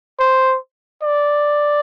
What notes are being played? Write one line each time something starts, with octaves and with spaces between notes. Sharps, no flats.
C5
D5